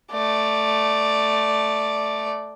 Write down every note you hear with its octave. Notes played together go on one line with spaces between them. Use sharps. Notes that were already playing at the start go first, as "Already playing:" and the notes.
A3 D5